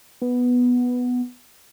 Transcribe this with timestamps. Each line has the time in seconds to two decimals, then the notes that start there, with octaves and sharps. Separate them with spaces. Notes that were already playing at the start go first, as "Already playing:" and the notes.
0.21 B3